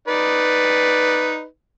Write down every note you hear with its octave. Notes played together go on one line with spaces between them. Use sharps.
D#4 B4 D5